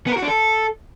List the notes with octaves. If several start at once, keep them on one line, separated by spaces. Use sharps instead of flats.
B3
A#4
F#4
D4
A4